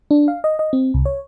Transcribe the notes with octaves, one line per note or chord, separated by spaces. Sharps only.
D4
F5
D#5
D#5
C4
C2
C#5